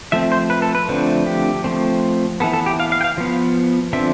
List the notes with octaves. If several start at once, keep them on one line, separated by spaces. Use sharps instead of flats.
F3 A3 C4 E5
C5
B4
A4
B4
D3 F3 A3 C4
G4
F3 A3 C4
E3 B3 A4
A4
G4
F5
F5
G5
F5
F3 B3
D3 F3 C4 E5